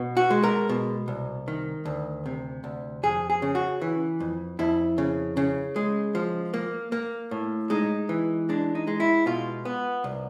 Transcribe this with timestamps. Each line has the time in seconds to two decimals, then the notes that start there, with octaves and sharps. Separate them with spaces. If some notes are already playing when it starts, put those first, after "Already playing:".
Already playing: B2
0.17 F#4
0.30 G#3
0.43 A#4
0.69 B2
1.08 C2
1.48 D#3
1.85 D2
2.26 C3
2.64 D2
3.03 F2 G#4
3.30 G#4
3.42 C#3
3.55 F#4
3.82 E3
4.20 F2
4.59 F2 E4
4.98 C#3
5.37 C#3
5.76 G#3
6.15 F3
6.54 A#3
6.92 A#3
7.31 A2
7.70 G#3 D#4
8.09 E3
8.49 G#3 D4
8.75 D#4
8.87 G#3
9.00 E4
9.26 B2 F4
9.65 B3
10.04 C2